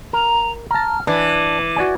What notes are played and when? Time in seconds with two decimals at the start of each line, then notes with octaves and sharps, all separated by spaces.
0.13 A#4 A#5
0.71 A5 A#5 F6
1.07 E3 D4 D6
1.76 F#4 D5 G#5